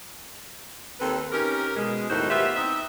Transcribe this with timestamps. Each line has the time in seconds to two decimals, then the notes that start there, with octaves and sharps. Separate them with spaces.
1.00 D#2 C4 A4 B4
1.32 C#4 D#4 G4 A#4
1.76 B2 G#3
2.10 D#2 A2 D#4 F#4 A#4 C5
2.30 B3 F4 G4 B4 E5
2.55 C4 D#4 D#5 E5